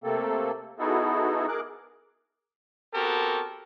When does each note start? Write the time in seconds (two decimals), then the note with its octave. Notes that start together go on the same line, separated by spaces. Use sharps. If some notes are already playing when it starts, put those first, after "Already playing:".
0.04 C3 A3 A#3 C4 A4
0.79 B3 D#4 E4 F#4 G#4 A4
1.48 G#4 A#4 D6 F#6
2.94 B3 C4 F#4 G4 A4 A#4